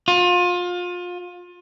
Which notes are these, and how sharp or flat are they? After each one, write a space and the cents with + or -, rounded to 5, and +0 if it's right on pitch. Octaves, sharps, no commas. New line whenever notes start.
F4 +30